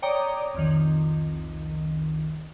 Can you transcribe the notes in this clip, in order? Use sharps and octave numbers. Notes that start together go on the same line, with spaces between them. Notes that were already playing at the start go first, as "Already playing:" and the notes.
C#5 D5 G5 A#5 D6 D#6
C2 F2 D#3